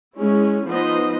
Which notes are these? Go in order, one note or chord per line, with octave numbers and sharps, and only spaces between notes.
G#3 C#4 E4
F3 B3 D#4 B4 C5 D#5